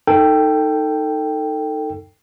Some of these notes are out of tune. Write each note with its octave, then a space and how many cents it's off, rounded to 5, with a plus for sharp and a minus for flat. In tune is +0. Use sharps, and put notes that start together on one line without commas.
D#4 +0 A4 +25 G5 +0